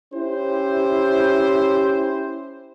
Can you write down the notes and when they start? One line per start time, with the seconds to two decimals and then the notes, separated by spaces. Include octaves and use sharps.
0.14 C#4 E4 G4 C5